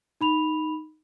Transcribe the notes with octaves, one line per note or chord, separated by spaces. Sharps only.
D#4 B5 F7